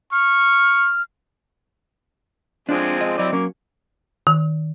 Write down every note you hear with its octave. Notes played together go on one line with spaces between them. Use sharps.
C#6 F6
F3 G#3 C4 D4 D5
D#5
F#3 C4 E4 D5 D#5
F#3 A#3 C#4
D#3